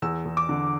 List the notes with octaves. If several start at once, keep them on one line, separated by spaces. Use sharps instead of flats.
E2 E6
E2
D6
D3